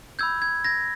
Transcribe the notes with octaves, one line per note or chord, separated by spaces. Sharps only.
B5 E6 G6 G#6
G#6
G#6 A#6